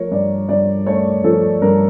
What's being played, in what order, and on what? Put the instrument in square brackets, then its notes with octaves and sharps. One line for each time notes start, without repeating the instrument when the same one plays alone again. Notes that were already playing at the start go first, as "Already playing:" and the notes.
Already playing: [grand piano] F3 A3 A#4 C#5
G2 D5
G2 D5
A3 C#5
F3 A4
G2 A#4